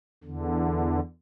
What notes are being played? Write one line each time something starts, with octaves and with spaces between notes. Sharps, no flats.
E2 D3